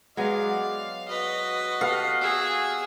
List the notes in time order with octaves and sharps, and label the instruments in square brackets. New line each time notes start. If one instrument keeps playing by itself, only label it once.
[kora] F#3 G#3 B3 [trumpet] D5 [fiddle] F5
[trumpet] F#4 [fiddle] B4 D#5
[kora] B3 G4 A4 [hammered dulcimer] F5
[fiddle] G#4 E6